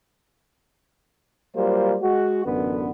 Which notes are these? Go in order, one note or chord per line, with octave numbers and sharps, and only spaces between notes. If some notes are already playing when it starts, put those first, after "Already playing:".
F#3 G3 A#3 F4 C5
G#3 F#4
A1 F#2 D3 B3